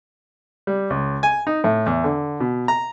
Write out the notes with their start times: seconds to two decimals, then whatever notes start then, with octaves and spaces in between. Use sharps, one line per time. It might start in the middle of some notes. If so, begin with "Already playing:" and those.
0.67 G3
0.90 C#2
1.23 G#5
1.47 D#4
1.64 A2
1.86 E2
2.04 D3
2.40 B2
2.68 A#5